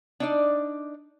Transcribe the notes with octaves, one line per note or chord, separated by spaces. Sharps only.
D4 D#4 D5